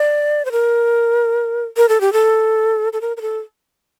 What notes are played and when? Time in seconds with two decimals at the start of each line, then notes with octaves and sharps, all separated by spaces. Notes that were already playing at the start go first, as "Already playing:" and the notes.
Already playing: D5
0.45 C5
0.52 A#4
1.77 A#4
1.89 A4
2.01 G4
2.13 A4
2.93 A4
3.01 A#4
3.17 A#4
3.21 A4